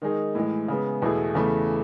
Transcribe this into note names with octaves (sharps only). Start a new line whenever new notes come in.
D#3 G#3 D#4 G#4
A2 E3 G#3
C#3 G#3 B3
E2 B2 A3 E4 G#4
E2 C#3 E3 A3 E4